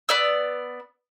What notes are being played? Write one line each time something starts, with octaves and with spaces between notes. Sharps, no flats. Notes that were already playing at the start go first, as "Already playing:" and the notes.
B3 D5 E6